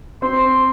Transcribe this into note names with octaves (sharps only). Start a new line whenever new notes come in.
C4 C6